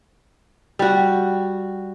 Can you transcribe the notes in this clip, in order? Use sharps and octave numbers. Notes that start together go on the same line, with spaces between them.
G3 F#4